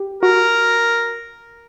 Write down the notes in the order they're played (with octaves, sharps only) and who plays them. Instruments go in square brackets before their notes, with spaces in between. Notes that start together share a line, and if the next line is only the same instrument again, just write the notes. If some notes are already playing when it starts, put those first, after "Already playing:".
Already playing: [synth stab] G4
[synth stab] F#4 [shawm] A#4